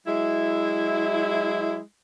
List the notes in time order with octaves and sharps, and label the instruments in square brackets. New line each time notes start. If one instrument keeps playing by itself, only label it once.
[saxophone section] F#3 G#3 E4